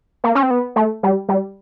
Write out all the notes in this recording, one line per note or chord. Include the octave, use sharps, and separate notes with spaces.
A#3
C#4
C4
B3
A3
G3
G3